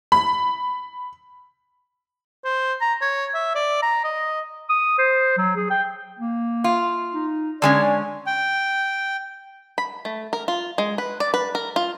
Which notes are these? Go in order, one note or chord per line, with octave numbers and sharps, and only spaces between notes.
B5
C5
A#5
C#5
E5
D5
A#5
D#5
D#6
C5
F#3
G#4
G5
A#3
F4
D#4
D3 G#3 C#4 D5
G5
B5
A3
A#4
F4
G#3
B4
D5
B4
A#4
F4